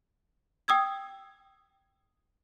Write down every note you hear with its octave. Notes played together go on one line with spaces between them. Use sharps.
G5 D#6 E6 G#6